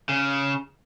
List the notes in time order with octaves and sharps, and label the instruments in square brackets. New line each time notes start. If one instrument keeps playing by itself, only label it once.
[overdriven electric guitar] C#3